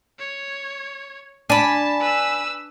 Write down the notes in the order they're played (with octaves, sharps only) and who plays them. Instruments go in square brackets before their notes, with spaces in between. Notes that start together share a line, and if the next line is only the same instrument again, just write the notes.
[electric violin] C#5
[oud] D4 [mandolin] G#5 B5 [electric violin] A5
[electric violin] B4 E6